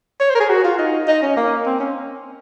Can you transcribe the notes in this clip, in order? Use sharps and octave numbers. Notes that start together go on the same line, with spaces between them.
C#5
C5
A#4
G#4
F#4
F4
D#4
D#4
C#4
A#3
C4
C#4